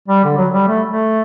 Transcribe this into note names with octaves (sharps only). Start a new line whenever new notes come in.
G3
D3
F#3
G3
A3
A3